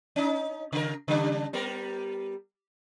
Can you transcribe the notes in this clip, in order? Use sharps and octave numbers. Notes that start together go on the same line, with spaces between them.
C#4 D#4
C#3 A#4
C#3 G3 D4
G3 B3 A#4